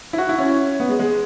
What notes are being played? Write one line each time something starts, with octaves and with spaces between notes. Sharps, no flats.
E4
F#4
E4
C#4
B3
G#3
G#3